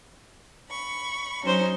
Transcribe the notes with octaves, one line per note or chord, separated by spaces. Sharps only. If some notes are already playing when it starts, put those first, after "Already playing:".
B5 C#6
F#3 C#4 D#4 C5